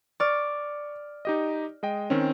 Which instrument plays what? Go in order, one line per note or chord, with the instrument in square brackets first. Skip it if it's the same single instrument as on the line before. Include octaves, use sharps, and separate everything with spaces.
[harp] D5 [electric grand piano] C#6 F6
[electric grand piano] D#4 G4 D#5
G#3 D#5 G5
D#3 C4 C#4